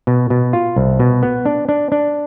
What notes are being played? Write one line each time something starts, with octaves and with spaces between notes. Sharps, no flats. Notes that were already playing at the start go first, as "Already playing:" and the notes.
B2
B2
F4
C2
B2
B3
D4
D4
D4